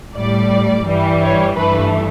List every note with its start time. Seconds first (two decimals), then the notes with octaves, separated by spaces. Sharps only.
0.16 A2 G3 D5
0.87 G2 E3 G3
1.22 C#5
1.56 G2 E3 A3 B4